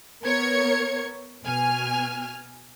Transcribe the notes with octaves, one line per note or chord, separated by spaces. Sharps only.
B3 A#4 C#5 G#6 C#7
B2 G#5 F6